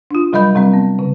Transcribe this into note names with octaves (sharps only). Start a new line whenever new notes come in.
D4 F4
C3 F#3 G3 D#5 B5 G6
C3 G3 C4
B3
C#3